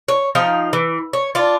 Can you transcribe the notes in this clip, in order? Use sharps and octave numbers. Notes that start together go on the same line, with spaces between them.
C#5
F3 D#4 F5 G5
E3
C#5
D4 F4